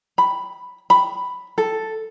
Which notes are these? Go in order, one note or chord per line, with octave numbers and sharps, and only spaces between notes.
B5
B5
A4